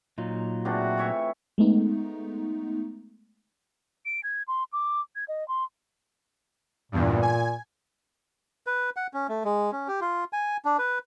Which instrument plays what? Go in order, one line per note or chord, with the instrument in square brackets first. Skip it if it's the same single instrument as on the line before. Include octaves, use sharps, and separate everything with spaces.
[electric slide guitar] A#2 F#3 D#4 [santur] F4
[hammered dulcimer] A2 D4 [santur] C4 G#4 B4 [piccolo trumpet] F#4
[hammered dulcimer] E3 C#5 E5
[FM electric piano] G#3 A3 B3 D#4
[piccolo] D7
G#6
C6
D6
G#6
D#5
C6
[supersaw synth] E2 G2 [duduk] A#2
[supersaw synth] G#5
[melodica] B4
F#5
C#4
A3
G#3
C#4
G4
F4
G#5
D4
B4